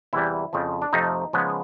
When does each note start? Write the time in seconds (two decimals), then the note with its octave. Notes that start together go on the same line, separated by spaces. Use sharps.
0.13 E2 C3 E3 G3 E4
0.53 F2 C#3 F3
0.82 D4
0.93 F2 C3 F3 A3 C4 D#4
1.33 C#3 F3 G#3 B3